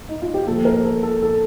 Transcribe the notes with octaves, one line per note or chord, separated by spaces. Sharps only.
D#4
F4
G4
A#2 F3 A4
A#4
A4
A4
A4